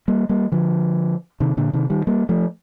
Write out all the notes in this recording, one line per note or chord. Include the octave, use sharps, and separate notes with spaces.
G3 A#3
G3 A#3
D3 F3
C3 D#3
A#2 D3
C3 D#3
D#3 G3
G3 A#3
F3 A3